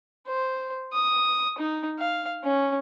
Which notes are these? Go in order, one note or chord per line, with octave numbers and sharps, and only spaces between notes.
C5
D#6
D#4
F5
C#4